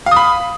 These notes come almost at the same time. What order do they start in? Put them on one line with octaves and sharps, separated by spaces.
F5 D#6 B5